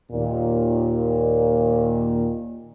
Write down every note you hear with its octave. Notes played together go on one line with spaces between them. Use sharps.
D#2 A#2